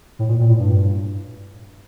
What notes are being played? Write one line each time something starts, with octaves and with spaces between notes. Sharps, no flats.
A2
A#2
A#2
A2
G2